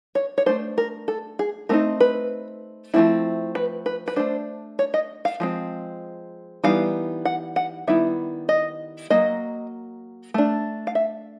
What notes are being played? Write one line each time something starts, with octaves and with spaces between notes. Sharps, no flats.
C#5
C#5
A3 D4 C5
A#4
A4
G#4
A3 C4 D#4 A#4
B4
F3 A3 C4 E4
B4
B4
B4
A3 D4 C5
C#5
D#5
F5
F3 G#3 C4
E3 G3 B3 D#4 F5
F#5
F#5
D#3 G3 B3 E4 E5
D#5
F#3 A#3 D#5
A3 D4
F5
E5